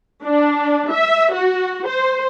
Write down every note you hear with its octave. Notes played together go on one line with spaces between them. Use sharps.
D4
E5
F#4
C5